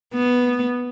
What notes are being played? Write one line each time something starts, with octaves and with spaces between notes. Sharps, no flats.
B3